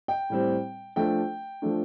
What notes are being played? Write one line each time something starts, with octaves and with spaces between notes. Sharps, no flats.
G5
A2 G3 C4
F3 A3 D4 G5
F3 A3 D4